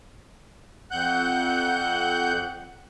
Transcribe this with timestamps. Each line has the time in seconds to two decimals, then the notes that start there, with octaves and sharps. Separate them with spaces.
0.91 F2 F#5 F#6 G6